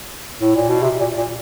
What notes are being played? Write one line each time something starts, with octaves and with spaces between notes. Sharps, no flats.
A2
A#2
B2
C3
A#2
A#2